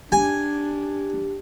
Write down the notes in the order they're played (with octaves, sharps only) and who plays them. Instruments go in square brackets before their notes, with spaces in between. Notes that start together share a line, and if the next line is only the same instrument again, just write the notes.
[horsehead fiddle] D4 [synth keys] G4 [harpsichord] G#5